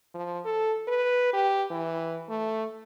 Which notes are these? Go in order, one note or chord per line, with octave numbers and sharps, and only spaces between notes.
F3
A4
B4
G4
E3
A3